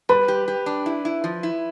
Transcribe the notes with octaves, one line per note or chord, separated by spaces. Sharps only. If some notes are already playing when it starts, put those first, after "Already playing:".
G3 B4
G4
G4
D4
E4
E4
F3
E4